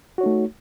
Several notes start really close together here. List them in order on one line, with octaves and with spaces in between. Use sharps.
F#4 C#5 D#4 A3